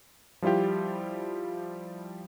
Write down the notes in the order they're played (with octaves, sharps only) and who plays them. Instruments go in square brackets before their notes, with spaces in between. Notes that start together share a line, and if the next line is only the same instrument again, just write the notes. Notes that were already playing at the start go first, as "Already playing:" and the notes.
[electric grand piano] F3 G3 E4 F4 G4